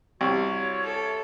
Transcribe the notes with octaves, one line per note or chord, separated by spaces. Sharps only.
C2 E4 F#4 C#5
A4